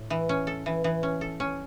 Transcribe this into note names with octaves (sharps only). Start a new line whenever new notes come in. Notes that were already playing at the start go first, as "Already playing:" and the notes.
Already playing: A2
E3
C#4
A4
E3
E3
C#4
A4
C#4